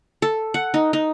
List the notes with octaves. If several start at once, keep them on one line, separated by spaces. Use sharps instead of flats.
A4
F#5
D#4
D#4